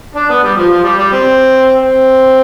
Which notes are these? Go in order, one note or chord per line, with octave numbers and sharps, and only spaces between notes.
D4
B3
G3
F3
F3
G3
G3
C4
C4